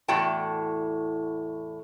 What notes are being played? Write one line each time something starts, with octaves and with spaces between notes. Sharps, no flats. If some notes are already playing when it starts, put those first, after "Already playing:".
E2 A2 F#4 D5 G5 A5